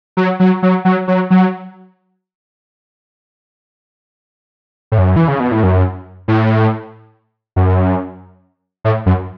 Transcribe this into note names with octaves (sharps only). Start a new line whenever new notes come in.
F#3
F#3
F#3
F#3
F#3
F#3
A2
F#2
E3
C#3
B2
A2
F#2
A2
F#2
A2
F#2